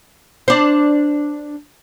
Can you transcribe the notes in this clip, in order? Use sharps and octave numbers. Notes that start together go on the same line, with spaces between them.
D4 C5